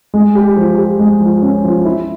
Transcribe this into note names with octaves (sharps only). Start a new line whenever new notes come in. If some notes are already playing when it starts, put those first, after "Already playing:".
G#3
G4
F3
G4
G#3
F3
C#4
F3
E4